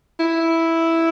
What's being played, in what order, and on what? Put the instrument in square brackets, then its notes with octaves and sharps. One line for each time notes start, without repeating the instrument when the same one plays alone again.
[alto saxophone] E4